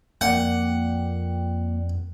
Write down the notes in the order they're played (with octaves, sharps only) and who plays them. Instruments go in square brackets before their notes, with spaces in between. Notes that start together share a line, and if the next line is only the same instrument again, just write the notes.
[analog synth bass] F2 [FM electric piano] A#3 D5 G5 [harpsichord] F#5